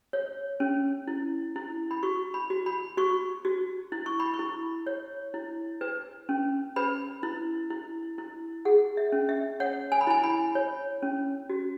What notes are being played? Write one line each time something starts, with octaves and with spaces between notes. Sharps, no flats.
C#5
C#4
E4
E4
B5
F#4 C#6
B5
F#4
B5
F#4 C#6
F#4
E4
C#6
B5
C#6
E4
C#5
E4
B4
C#4
B4 B5
E4
E4
E4
G#4 F#5
E5
C#4
E5
C#5 F#5
G#5
B5
E4 G#5
B5
C#5
C#4
F#4